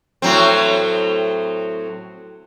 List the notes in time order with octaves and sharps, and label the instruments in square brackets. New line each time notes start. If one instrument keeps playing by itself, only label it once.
[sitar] A2 F#3 C4